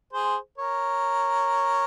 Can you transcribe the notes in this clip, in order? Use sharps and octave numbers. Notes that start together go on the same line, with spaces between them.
G#4 C5
A#4 C#5